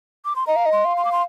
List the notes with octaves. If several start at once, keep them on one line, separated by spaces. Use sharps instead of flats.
D6
C6
D#5 A#5
F5
D#5
C6
F5
C6
D6
C6